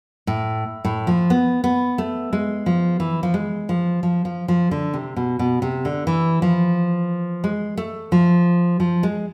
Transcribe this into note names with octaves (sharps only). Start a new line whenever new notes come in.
A2
A2
F3
B3
B3
A3
G#3
F3
E3
F3
G#3
F3
F3
F3
F3
D3
C3
B2
B2
C3
D3
E3
F3
G#3
A3
F3
F3
G#3